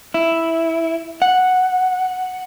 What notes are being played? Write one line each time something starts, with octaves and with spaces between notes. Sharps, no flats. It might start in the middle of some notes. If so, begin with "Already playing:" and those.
E4
F#5